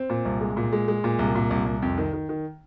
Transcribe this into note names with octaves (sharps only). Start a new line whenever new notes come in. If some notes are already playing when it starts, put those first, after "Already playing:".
Already playing: C4
A#2
C2
G#3
A#2
G#3
G#3
A#2
C2
A#2
C2
C2
F2
D#3
D#3
D#3